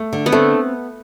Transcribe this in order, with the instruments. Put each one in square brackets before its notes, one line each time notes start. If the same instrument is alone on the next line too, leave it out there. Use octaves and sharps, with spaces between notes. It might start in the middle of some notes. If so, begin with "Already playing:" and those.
Already playing: [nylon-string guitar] A3
D3
[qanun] B3
[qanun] A3 [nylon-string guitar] C4